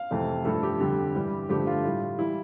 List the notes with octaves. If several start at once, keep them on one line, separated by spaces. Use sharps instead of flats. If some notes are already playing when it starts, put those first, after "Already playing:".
Already playing: F5
F2 C3 E3 A3
G2 F3 A3 A4
G4
F2 D3 G3
G2 E3 G3
G2 D3 F3 A3 G4
F4
A2 G3
E3 G3 E4